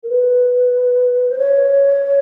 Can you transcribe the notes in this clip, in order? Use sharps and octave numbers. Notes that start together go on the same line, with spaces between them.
A#4
B4
C5
C#5